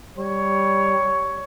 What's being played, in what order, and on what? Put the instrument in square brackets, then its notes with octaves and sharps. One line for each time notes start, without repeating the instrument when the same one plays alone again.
[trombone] G3 [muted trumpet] C#5